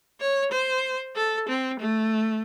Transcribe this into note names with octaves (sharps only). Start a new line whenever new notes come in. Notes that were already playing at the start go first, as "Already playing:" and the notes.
C#5
C5
A4
C4
A3